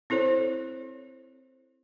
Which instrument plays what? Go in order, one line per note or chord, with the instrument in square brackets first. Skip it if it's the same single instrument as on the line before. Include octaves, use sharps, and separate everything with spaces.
[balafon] C4 E4 A4 C5 C#5